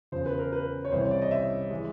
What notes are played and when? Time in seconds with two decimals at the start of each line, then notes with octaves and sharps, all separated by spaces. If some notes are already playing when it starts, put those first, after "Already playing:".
0.12 E2 C#3 F3 C5
0.26 B4
0.39 A#4
0.52 B4
0.85 C#5
0.91 C2 C3 E3 C5
1.01 C#5
1.11 D5
1.22 D#5
1.31 E5
1.71 E3 G#3